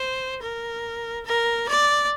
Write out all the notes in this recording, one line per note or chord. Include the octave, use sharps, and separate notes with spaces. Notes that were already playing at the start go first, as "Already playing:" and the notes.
Already playing: C5
A#4
A#4
D5